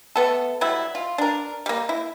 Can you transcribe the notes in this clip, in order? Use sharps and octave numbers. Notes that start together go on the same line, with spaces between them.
A3 B3 A4
F#3 G3 E4
F4
D4 A#4
G3 A#3
E4